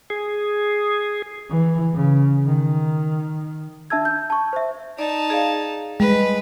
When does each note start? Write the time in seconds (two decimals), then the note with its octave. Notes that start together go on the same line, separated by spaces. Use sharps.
0.10 G#4
1.50 E3
1.94 C#3
2.46 D#3
3.90 D4 E5 A5 E6 G#6
4.05 G6
4.30 A5 C#6
4.53 C5 E5
4.99 D#4 D5 A5
5.30 G#4 D5 F5
6.00 G3 G#3 B4